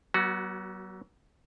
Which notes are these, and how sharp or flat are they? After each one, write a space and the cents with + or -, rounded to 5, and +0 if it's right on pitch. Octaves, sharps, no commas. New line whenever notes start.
F#3 +35 B3 -40 F#4 +0